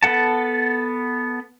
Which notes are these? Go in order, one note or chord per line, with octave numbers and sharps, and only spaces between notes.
B3 A4 F#5 A5